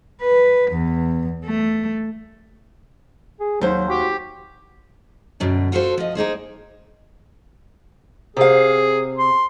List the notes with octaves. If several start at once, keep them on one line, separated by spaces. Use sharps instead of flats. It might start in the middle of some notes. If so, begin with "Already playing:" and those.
B4
E2
A3
G#4
D#2 F#3 C5
F#4 G4
F#2 B2 D3
F4 F#4 A4 B4 C5
F3 D#5
A#3 D#4 G#4 C5
C3 G#4 F5
C6